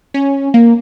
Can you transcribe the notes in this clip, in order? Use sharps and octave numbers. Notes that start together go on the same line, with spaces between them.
C#4
A#3